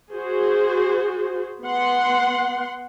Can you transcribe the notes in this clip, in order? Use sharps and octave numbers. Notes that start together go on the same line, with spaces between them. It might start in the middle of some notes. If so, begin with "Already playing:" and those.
F#4 G#4 C5
B3 F#5 C6